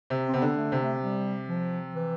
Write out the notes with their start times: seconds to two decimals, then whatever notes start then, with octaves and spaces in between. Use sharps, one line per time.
0.10 C3
0.29 C4
0.34 C3 B3
0.42 D3
0.57 A3
0.72 C3
0.80 A3
1.03 G3
1.49 F3
1.95 E3